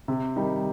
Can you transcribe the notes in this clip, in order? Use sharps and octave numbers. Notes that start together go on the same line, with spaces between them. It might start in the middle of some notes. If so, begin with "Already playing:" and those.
C3
D#3 G3 D#4